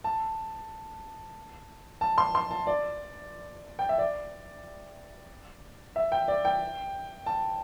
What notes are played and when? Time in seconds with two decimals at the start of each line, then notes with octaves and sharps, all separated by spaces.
0.04 A5
2.01 A5
2.18 C6
2.35 C6
2.51 A5
2.67 D5
3.79 G5
3.89 E5
3.98 D5
5.96 E5
6.12 G5
6.28 D5
6.45 G5
7.26 A5